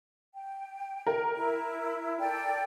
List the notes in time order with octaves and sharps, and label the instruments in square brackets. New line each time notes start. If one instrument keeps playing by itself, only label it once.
[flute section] G5
[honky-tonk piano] A#4
[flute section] E4
A4 D5 G5